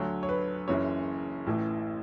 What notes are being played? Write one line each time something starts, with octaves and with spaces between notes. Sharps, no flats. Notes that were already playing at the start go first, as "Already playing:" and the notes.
Already playing: D2 D3 F#3 C#5
C#5
B4
F#1 F#2 C#3 E3 C#5
A1 A2 E3